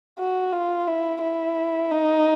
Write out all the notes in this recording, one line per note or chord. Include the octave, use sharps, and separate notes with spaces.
F#4
F4
E4
E4
D#4